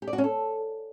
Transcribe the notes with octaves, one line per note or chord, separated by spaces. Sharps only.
G4
D5
F#4
C#4
A4